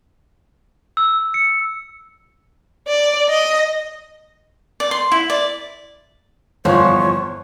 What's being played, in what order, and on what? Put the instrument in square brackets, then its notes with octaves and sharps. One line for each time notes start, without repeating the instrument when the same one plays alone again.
[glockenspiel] E6
C#7
[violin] D5
D#5
[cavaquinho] D5
C6
E4
D5
[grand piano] G1 [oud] E2 F3 [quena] C#5